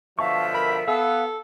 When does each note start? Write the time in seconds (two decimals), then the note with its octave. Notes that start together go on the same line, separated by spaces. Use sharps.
0.19 B2 D3 F3 E5 F5 A5 C#6
0.54 A#4 B5
0.88 B3 A4 F5 E6